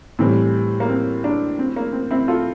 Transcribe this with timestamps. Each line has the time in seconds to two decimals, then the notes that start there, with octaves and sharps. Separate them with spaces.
0.19 A2 E3 G3 C4
0.80 A#3
0.89 C4
1.24 A#3 D4
1.59 C4
1.76 A#3
1.93 C4
2.11 C4 E4
2.28 F4 A4